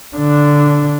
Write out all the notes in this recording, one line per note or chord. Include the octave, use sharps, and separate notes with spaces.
D3 D4